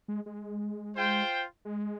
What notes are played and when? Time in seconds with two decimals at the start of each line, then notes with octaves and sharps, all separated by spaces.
0.08 G#3
0.26 G#3
0.95 F4 C5 G5
1.65 G#3